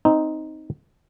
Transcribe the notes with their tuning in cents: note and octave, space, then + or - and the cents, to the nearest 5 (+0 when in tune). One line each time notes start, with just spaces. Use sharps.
C4 +0 D#4 +0